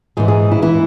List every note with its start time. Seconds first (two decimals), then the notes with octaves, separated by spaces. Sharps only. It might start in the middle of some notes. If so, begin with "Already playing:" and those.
0.17 G#2 E3 G#4
0.28 G#4
0.52 E4
0.62 E3 E4